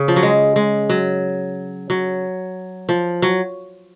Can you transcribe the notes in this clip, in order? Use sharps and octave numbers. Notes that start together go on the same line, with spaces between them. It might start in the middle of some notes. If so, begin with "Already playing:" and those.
Already playing: C#3
F3
F#3
G#3
G#3
F#3
F#3
F3
F#3